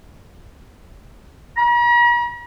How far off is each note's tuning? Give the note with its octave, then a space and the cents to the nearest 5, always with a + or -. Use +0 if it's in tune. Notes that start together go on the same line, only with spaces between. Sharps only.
A#5 +45